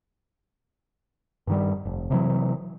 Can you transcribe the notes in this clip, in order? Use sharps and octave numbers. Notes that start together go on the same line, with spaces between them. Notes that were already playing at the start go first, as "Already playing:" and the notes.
G2 D#3 G3
F1
C3 E3 F#3